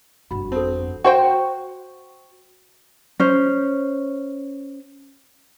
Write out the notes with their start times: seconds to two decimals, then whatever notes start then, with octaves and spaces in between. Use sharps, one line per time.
0.31 G1 F2 F#4 B5
0.52 C4 A4 A5
1.04 F#4 C5 G5
3.20 C#4 C5